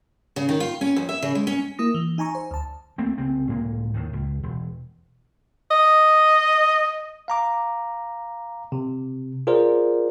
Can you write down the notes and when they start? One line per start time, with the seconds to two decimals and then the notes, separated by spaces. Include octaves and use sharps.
0.36 C#3
0.49 D#3
0.60 F4
0.81 C#4
0.96 F2
1.09 E5
1.22 C#3
1.35 G#3
1.47 C#4
1.79 A#3 E4 D#6 A#6
1.94 E3
2.18 D#4 G#5 A#5 C#6
2.35 C5
2.51 D2 A5
2.98 D2 A3 A#3 C4
3.18 C2 C#3 C4
3.47 C#2 A2 A#3
3.94 D#2 A2 D#3
4.13 C#2
4.43 E1
5.71 D#5
7.28 F5 A#5 D6
8.72 C3
9.47 F4 G#4 A#4 C5 D5